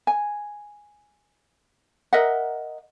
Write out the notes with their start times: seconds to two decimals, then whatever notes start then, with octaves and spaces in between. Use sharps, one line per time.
0.07 G#5
2.13 A#4 D#5 E5 F#5